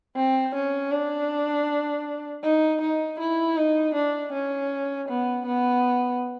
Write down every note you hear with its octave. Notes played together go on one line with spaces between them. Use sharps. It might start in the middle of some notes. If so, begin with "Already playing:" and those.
C4
C#4
D4
D#4
D#4
E4
D#4
D4
C#4
B3
B3